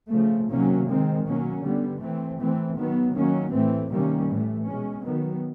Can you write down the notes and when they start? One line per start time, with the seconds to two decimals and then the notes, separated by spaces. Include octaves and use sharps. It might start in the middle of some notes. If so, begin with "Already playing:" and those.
0.10 C#3 F3 A3
0.49 C3 D#3 F#3 A#3 C#4
0.86 D#3 G#3 C4
1.24 B2 F#3 A#3 C#4
1.62 D3 G3 B3
2.00 E3 A3 C4
2.39 E3 A3 C4
2.77 D#3 F#3 B3
3.15 D#3 F#3 A#3 C#4
3.52 A2 E3 A3 C4
3.90 C3 D#3 G3 A#3 C#4
4.28 A2 E3 A3
4.66 B2 G#3 C#4
5.04 D#3 F#3 B3